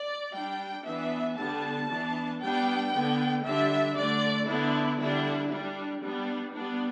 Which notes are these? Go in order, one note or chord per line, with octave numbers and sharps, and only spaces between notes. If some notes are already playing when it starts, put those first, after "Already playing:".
Already playing: D5
G3 D4 G5
E3 B3 D4 E5
D3 G3 B3 D4 A5
E3 B3 D4
G3 B3 D4 G5
D3 B3 D4
D3 G3 D4 E5
D3 A3 D4 D5
D3 B3 D4 E4
D3 G3 D4 E4
G3 D4
G3 B3 D4
G3 B3 D4